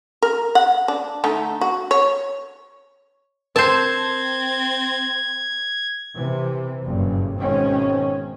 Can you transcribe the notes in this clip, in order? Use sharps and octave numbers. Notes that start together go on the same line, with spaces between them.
A#4
F#5
D4
D3 A3 D#4
F#4
C#5
C4 A#4 C5 A5 G#6
C3 E3
F#1 G2 A#2 C#3
G#1 B2 D#3 C4 C#4